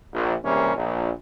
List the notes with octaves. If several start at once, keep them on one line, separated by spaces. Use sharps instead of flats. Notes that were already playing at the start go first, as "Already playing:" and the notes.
A#1
C#2 C3 E3 G3 A#3 C#4
A#1